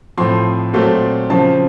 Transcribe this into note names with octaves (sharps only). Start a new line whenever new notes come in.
A2 F3 C4 C6
A#2 F#3 A3 C4
C#3 F3 C4 A5